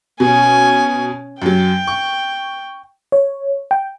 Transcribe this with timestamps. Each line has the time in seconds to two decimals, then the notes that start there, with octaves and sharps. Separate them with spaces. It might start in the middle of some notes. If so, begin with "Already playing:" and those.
0.20 B2 C#4 G#5
1.42 F#2 F#3 G5
1.87 C#6
3.12 C#5
3.71 G5